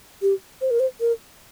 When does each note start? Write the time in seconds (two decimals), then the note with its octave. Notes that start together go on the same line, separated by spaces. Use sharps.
0.22 G4
0.61 C5
0.71 A#4
0.80 C5
1.00 A#4